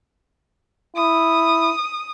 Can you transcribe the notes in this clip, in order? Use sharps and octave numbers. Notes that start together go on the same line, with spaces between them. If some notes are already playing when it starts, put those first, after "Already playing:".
E4 D#6